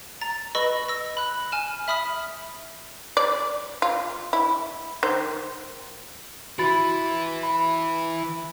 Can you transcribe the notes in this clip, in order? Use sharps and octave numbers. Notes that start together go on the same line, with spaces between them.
A#5 A6
B4 D#5 B5 C#6 E6 A#6
E6 A#6
B5 F#6
G#5 F6 E7
E5 B5 D#6 F6 B6
D5
F4
E4
D#3 C5
E3 E4 F#4 B5 A6
B5